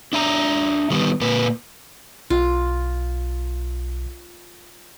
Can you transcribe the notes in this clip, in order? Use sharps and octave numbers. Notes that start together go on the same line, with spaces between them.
D4 E5 A#5
D#3 G3 B3
A#2 A#3 B4
B1 F4